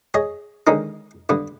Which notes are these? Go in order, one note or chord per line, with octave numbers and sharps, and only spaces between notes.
G#4 C#5 D#5
D3 D#3 G#3 C#4 D#4
G2 D3 B3